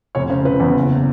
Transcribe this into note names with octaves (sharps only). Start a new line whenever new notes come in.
F1 C#5
C#3 C5
C#3 B4
E2
F#1